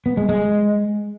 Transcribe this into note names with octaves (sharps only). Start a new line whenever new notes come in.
B3
G#3
G#3